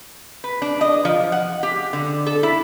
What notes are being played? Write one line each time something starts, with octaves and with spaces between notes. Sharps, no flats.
B4
D4
D#5
F3
F#5
G4
D3
A4
E4